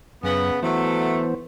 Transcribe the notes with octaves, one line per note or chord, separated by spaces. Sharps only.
F#2 C#3 B3
E3 F#3 A3 B3 C5